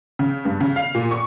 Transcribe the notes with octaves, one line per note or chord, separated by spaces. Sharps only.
C#3
G2
C#3
F5
A#2
C#6